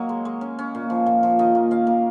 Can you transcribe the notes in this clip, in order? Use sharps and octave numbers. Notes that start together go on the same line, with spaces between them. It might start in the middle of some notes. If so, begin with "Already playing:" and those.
Already playing: F#3 A#3 C#5 D#5
G#3
G#3
C#4
C#4
A#2
F3
A#2
F3
D#3 D#5
A#3
C#4 F5
A#3